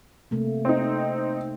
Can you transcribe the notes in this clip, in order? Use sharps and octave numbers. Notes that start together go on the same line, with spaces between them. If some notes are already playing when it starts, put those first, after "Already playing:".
C3 A3 A#3
C4 D#4